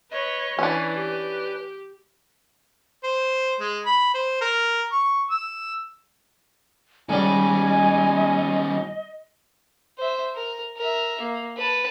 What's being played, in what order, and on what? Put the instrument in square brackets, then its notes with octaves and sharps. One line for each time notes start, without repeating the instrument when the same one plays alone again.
[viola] B4 C#5 [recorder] D#5
[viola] E3 [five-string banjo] C#4 D4 [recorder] B4
[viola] G4
[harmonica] C5
G#3
B5
C5
A#4
C#6
E6
[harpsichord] G#2 G3 [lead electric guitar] D#3 C#4 [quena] D#5 [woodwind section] G#5
[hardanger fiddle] C5 E5
A#4
A#4 E5
A#3
B4 A5